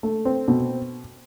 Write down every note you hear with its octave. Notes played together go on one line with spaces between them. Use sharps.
A3
C4
B2